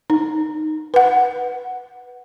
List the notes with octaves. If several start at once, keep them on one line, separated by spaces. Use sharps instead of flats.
D#4
B4 F#5